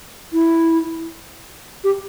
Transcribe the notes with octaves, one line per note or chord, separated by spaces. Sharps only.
E4
G4